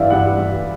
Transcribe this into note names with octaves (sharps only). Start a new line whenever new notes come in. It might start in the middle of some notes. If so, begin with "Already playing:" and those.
Already playing: G2 E3 D5 E5 F5
G2 F#5
G2